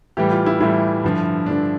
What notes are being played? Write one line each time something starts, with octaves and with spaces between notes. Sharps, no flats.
A2 E3 G3 G4
F4
E4
A2 E3 G3 E4
G2 D3 F3
G2 D3 F3 D4